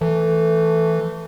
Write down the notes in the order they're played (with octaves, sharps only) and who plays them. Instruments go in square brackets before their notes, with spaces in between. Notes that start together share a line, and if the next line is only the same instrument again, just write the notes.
[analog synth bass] E3 [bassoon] A3